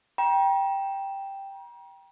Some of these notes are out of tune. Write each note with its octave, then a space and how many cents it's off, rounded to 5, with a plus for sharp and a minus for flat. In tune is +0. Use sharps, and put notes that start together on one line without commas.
G5 +0 A#5 +40